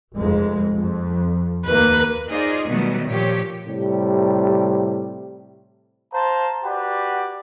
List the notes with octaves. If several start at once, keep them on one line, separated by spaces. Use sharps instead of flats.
F1 F2 G#3
F2
D#2 A#3 B4
D#4 F4 G#4 C5 D5 D#5
B2 D#3 F#3 G3 A3 B3
A#2 F3 G4 C#5
A2 C3 G3
C5 F5 A5 A#5
F#4 G4 B4 D5